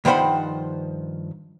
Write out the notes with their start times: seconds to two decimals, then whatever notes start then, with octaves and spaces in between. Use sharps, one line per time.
0.05 G2 D#3 F3 C5 F#5 B5